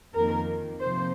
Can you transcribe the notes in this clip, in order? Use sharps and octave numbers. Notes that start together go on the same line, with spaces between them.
F2 D#3 A#3 A#4
C3 F3 A#3 C5